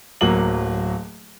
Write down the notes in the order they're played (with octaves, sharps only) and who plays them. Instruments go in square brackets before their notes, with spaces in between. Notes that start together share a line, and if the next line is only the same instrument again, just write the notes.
[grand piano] D1 F#3 A#3 F#7